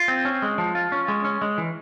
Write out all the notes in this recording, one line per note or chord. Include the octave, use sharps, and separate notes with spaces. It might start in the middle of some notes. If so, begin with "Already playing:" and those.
Already playing: F4
C4
C#4
G#3
F3
F4
C#4
G#3
C#4
G#3
E3